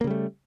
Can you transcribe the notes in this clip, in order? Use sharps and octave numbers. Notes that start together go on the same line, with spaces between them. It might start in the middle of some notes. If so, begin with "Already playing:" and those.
C#3 G3 A3 A#3